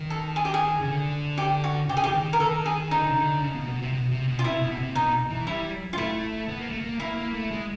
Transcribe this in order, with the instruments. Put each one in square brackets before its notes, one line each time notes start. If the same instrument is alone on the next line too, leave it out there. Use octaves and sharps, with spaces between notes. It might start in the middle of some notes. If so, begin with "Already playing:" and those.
Already playing: [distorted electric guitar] D#3
[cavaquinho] A4
G#4
G4
G#4
[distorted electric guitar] C#3
D3
[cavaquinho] G4
F#4
[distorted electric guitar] C#3 [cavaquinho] G4
[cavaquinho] G#4
[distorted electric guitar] E3 [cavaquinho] G4
[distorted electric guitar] D#3
[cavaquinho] A#4
[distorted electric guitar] D#3 [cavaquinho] A4
[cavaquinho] G#4
[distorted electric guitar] D#3 [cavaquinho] D#4
[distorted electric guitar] D3
C#3
D3
C#3
B2
B2
C3
B2
C3
B2
[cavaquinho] F4
[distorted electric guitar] C3 [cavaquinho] E4
[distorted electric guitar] B2
C3
[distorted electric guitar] B2 [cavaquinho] D#4
[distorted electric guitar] E3
[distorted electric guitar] G3 [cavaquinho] E4
[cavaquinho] F4
[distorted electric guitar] A3 [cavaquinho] E4
[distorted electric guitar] B3
A#3
A3
A#3
[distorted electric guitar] A#3 [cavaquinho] E4
[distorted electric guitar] A#3
A3
G#3